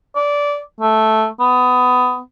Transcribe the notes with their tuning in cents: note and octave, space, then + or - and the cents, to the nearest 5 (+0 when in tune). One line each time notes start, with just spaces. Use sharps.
D5 -15
A3 -5
B3 +20